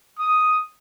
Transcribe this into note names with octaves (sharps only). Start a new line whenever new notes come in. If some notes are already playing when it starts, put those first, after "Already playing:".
D#6